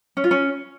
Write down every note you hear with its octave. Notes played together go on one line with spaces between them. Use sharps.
C#4
F4
C#4